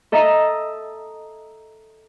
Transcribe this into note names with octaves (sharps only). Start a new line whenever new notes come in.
A4 D#5 E5 A#5